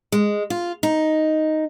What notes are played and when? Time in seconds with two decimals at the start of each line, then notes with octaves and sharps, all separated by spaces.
0.12 G#3
0.50 F4
0.83 D#4